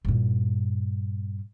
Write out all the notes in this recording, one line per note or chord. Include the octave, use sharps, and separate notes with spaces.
G2 A#2